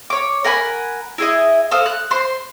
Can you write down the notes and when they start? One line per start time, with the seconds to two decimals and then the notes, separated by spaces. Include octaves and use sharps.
0.10 C#5 D6
0.44 A#4 F#5 G#5 B5
1.18 E4 G#4 D#5
1.71 A4 C5 F5 D#6
1.86 F#6
2.11 C5 C6